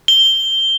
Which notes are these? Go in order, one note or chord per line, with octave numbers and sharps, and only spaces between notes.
G7